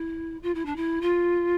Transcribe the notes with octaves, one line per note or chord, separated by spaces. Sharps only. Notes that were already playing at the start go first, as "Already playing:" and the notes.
Already playing: E4
F4
E4
D4
E4
F4